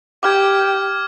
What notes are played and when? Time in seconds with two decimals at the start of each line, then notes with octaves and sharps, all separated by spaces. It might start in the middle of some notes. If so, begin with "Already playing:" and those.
0.23 G4 D6 F6 G#6